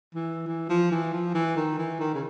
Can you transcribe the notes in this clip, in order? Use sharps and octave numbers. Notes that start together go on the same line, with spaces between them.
E3
E3
F3
E3
F3
E3
D#3
E3
D#3
C#3